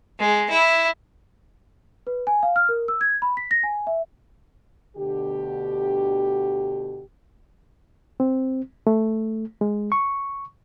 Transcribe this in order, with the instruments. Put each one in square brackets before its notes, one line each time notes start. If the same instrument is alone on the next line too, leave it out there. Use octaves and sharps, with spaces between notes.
[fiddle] G#3
E4
[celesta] B4
G#5
F5
F6
A#4
E6
G#6
B5
B6
A#6
G#5
E5
[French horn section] D2 B2 D3 G4
[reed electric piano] C4
A3
G#3
C#6